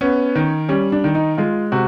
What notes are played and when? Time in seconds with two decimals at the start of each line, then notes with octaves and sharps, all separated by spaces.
0.01 B3 C#4
0.35 D#3
0.69 G3 C#4
0.92 D4
1.04 D#3
1.15 D#4
1.38 G#3 F4
1.72 C3 F#4